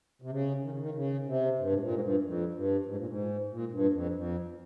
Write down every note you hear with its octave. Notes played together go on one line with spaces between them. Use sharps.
C3
C#3
D#3
C#3
D#3
C#3
C3
G2
G#2
A#2
G#2
G2
F2
G2
G#2
A#2
G#2
A#2
G2
F2
F2